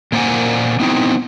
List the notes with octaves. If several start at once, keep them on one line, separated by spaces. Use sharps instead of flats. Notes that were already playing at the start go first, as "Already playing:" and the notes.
A#2 A#3 C5 D5 F#5 G#5
B3 C4 D#4 E4